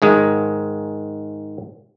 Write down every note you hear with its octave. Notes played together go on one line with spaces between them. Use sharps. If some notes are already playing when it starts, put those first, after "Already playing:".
G#2 D#3 G#3